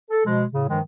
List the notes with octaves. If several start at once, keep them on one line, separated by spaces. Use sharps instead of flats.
A4
B2 F3 G#3
A2 C#3
G2 D#3 F3 G#3